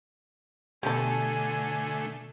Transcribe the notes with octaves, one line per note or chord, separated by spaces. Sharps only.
B2 D3 A3 B3 D4 G4 A4 G#5